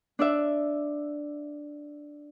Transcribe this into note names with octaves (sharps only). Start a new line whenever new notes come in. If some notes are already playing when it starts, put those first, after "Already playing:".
D4 D5 E5